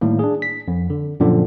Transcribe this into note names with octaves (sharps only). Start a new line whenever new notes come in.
A2 D#3 G3 A#3
D4 G#4
B6
F2
D3
F#2 A#2 D3 F3 C4 D4